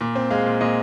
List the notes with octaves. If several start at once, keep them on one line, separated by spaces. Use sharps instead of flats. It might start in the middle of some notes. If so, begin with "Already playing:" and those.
A#2
C4
G#3 F5
A#2
A#2 D#5